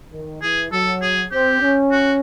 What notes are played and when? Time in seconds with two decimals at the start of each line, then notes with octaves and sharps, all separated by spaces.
0.12 D#3
0.42 E3 G#4
0.72 F#3 A4
1.02 G#4
1.31 C4 G4
1.61 C#4
1.92 F#4